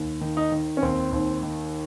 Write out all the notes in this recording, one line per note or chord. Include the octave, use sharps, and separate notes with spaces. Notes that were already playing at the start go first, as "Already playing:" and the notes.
Already playing: D#2
D#3
D#4
D#3
C#4
D#2 C4
D#2
D#3